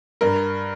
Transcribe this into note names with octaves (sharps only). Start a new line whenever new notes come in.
G2 A#4